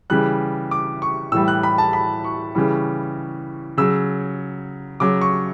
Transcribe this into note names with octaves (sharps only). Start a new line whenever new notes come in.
C#3 E3 G3 F#6
D6
C#6
A2 E3 G3 E6
F#6
B5
A5
B5
C#6
C#3 E3 G3
C#3 F#3 E6
C#3 F#3 D6
C#6